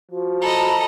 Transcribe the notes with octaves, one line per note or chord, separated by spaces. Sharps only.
F3 F#4
A4 D#5 A#5 B5